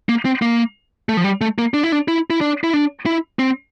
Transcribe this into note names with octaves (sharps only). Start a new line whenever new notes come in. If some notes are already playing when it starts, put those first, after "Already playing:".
A#3
C4
A#3
A3
F3
G3
A3
A#3
D4
E4
D4
E4
E4
D4
E4
D4
E4
C4